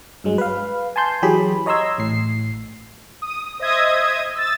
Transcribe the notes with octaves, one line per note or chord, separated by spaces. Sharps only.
G2 F#3 G#3
B4 F5
G#5 A5 C6 G6
E3 F#3 G4 G#4 B5
C#5 D#5 A#5 C6 E6 G#6
A1 A2 C7
D#6
C5 D#5 E5 D#6 G#6
E6 A6